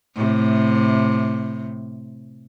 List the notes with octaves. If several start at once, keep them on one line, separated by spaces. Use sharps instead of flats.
A2 C3